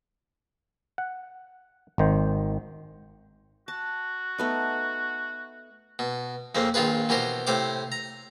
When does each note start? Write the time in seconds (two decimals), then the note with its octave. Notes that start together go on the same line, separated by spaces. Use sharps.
0.98 F#5
1.98 G#1 D#3 C5
3.68 F#4 A5
4.38 A3 B3 D#4
5.99 B2
6.55 F2 C#3 A#3 C4
6.74 A#1 D#3 F4 G#4 B4
7.09 B2 E3 G4 A#4 C5
7.47 A2 C3 C5 F5 D6
7.92 A#5